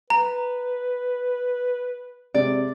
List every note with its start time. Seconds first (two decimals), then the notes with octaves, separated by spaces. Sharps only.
0.10 B4 A#5
2.34 C3 G#3 D5